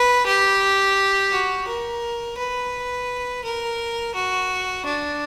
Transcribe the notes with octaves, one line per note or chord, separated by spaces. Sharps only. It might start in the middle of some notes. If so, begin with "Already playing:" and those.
Already playing: B4
G4
F#4
A#4
B4
A#4
F#4
D4